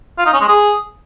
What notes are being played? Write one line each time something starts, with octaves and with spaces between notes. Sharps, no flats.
F4
D#4
C#4
G#3
G#4